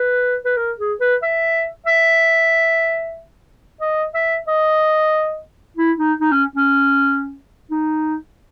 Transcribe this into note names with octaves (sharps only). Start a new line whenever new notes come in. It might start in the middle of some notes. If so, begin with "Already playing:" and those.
Already playing: B4
B4
A#4
G#4
B4
E5
E5
D#5
E5
D#5
E4
D#4
D#4
C#4
C#4
D#4